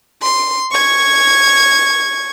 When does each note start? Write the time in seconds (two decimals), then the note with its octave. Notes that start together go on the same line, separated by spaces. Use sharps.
0.22 C6
0.71 C#6 G#6